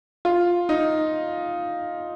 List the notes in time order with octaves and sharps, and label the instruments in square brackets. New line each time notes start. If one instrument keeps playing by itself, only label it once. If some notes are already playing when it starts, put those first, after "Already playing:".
[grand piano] F4
D#4